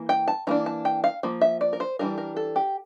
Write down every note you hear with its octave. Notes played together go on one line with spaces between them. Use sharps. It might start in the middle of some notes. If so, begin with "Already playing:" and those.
Already playing: E3 A#3
G5
A5
E3 A#3 D4 A#5
A5
G5
F5
F3 A#3
E5
D5
A#4
C5
E3 G3 D4 A#4
A#4
A4
G4